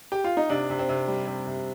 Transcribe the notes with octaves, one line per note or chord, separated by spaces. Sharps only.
G4
F4
D#4
C3 D4
C3
C4
C3
G3
C3
C3